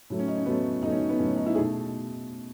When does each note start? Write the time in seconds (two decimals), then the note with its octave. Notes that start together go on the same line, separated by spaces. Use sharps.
0.10 A2 F#3 A3
0.19 C#4
0.28 D#4
0.37 C#4
0.46 A2 F#3 A3 B3
0.82 A2 F#3 A3 D#4
0.91 C#4
1.09 B3
1.19 A2 F#3 A3 C#4
1.37 D#4
1.46 E4
1.55 A3 G#4
1.58 B2